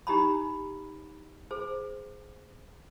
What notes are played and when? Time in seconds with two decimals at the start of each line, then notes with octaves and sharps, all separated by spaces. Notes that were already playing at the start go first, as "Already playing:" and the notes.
0.07 D#4 G4 A#5 B5
1.51 G#4 C5